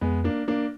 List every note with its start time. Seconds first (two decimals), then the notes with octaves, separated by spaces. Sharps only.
0.01 F2 G#3 B3
0.24 A#3 D4
0.48 A#3 D4